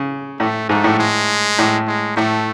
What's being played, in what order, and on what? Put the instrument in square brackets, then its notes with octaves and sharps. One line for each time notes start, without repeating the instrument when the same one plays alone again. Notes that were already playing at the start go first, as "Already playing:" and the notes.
Already playing: [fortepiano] C#3
[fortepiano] A2 [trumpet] A3
[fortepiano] G#2 [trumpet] A3
[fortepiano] A2
[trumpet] G#3
[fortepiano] A2
[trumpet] G#3
[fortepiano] A2 [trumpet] A3